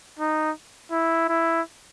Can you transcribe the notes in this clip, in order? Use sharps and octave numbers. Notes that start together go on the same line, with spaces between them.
D#4
E4
E4